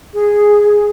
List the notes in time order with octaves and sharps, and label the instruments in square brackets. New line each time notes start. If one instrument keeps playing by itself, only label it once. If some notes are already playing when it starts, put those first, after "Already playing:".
[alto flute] G#4